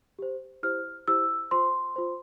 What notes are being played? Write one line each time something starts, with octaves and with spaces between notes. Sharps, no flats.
G4 C5
E4 G4 C5 F6
E4 G4 C5 E6
F4 C5 C6
F4 C5